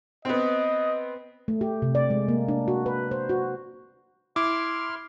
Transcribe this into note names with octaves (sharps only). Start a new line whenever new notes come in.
B3 C4 D#5
A3
G4
C3
D5
G#3
A#3
D4
F#4
B4
C5
F#4
E4 C6 D6 F6